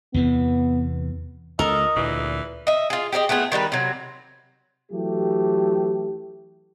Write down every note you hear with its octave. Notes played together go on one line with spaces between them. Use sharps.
E2 C3 E3 B3
C#2 A4 A#4 D#5
D2 A#2 E3
D#5 E5
F4 G#4
G4 G#4 D5 D#5
A3 B3 F4 G#4
D#3 G3 A#4 B4
C3 F#3
E3 F#3 A3 G4